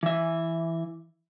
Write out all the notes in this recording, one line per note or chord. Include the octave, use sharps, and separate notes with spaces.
E3 E5